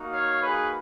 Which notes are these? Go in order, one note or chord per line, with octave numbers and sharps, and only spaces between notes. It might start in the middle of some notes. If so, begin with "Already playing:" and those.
Already playing: A#3 D#4 F#4
C#5 F5
G#4 B4